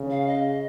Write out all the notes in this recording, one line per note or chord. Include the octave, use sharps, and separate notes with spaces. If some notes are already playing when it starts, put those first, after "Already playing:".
Already playing: C#3
F5
D#5